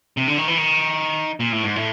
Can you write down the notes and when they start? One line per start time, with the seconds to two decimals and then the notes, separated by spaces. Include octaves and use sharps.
0.17 C3
0.28 D3
0.38 D#3
0.48 E3
0.57 D#3
1.40 A#2
1.52 A2
1.64 G#2
1.76 A2